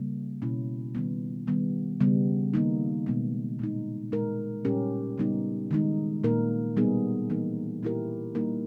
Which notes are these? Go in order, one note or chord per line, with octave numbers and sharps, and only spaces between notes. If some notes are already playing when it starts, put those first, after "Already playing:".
Already playing: C#3 G3 A#3
B2 A#3 C#4 E4
D#3 G3 B3
D#3 G3 B3
C#3 G3 B3
D#3 A#3 D#4
B2 G#3 B3
A#2 G#3 D#4
A#2 G#3 D#4 A#4
A#2 G3 C#4 G4 A#4
C#3 G3 B3 D#4
D#3 G#3 D#4
A#2 A#3 D#4 A#4
B2 G3 B3 D#4 G#4
E3 A#3 D#4 A#4
A#2 A#3 E4 G4 A#4
G3 A#3 D#4 A#4